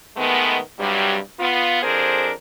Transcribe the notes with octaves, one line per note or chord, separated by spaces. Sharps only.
D#3 G#3 A3 B3
G2 C3 F#3 G3
B3 F4
F2 D4 G#4 A#4 C5